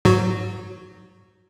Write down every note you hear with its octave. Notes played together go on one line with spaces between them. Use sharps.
G#2 F#3 F#4